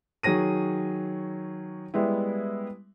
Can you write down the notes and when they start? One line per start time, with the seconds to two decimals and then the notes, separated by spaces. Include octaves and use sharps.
0.23 D#3 F#3 G#4 C#5 A#6 D#7
1.94 G3 G#3 B3 E4